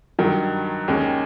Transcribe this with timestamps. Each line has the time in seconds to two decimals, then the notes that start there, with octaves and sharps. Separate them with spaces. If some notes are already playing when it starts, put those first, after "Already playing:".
0.19 G2 D#3 F#3
0.88 D#2 D#3 G#3 C#4